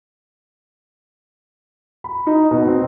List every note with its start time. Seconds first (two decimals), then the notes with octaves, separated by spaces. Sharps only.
2.04 B5
2.27 D#4
2.51 B2
2.67 C4